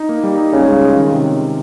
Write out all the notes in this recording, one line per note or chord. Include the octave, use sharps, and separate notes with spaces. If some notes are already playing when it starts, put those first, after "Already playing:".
Already playing: D#4
A#3
G3
D#4
C#3 C#4
G#3
F4
D#3
C3